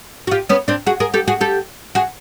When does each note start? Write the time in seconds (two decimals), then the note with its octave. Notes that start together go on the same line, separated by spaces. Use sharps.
0.27 F#4
0.31 F4 G4
0.49 B3 C#4
0.68 C4 D4
0.87 F#4 G#4
1.00 G#4 A#4
1.14 G4 A4
1.28 F#4 G#4
1.41 G4 A4
1.95 F#4 G#4